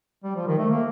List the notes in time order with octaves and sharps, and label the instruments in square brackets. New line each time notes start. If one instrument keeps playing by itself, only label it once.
[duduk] G3
F3
D#3
A3
A#3